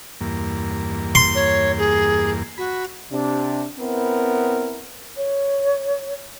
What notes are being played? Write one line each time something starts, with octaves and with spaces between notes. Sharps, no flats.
E2 G2 A#3
C6
C#5
G#4
F#4 B5
C3 D4
B3 C4 E4 A#4
C#5